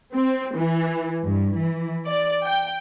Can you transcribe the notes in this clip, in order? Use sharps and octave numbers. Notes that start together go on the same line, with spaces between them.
C4
E3
G2
E3
D5
G5